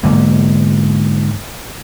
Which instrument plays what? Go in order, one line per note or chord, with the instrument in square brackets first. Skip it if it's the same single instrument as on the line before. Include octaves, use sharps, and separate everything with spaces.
[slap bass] G#2 D3 A#3